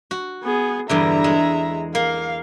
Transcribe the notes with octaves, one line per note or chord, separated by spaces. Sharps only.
F#4
B3 G#4
E2 G2 D3 E5 A#5
G#3
A#3 F5